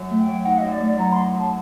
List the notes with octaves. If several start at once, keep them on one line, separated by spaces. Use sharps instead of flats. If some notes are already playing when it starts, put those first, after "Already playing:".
Already playing: F#2
A3
G5
F#3
D#4 F#5
D#5
F#2
D5
A3
D5
F#3 A#5
D#4 C6
F#2 A5